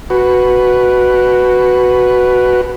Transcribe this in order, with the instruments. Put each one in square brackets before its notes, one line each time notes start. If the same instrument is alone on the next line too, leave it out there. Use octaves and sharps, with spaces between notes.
[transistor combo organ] F#4 B4